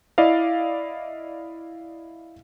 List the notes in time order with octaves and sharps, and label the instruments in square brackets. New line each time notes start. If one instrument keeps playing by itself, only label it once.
[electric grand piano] E4 D5 D#5 F5